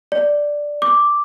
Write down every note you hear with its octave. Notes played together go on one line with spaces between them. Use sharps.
D5
D6